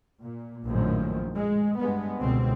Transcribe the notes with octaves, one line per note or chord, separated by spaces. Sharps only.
A#2
A#1 F#2 A2 D#3 F3
G#3
G2 G#3 B3
C#2 B2 D3 C4